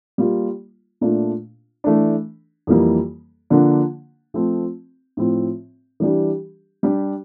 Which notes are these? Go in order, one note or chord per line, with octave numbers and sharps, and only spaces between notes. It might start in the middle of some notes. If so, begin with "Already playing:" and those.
G3 A#3 F4
A#2 A3 D4 F4
E3 A3 D4
F2 E3 G3 A#3
D3 F3 A#3 D4
F3 A3 C4
A2 F3 C4
E3 G3 D4 G4
G3 D4 G4